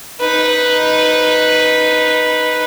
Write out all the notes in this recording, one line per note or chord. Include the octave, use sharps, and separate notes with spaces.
D#4 B4